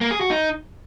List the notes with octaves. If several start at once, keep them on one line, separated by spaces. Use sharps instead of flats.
A#3
G#4
F#4
D#4